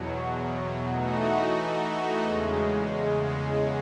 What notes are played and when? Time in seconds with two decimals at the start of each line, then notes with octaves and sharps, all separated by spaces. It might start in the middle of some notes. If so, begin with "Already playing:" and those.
Already playing: E2 B2 F#3
0.92 E3 A3 D#4 F#4
2.23 E2 C#3 G#3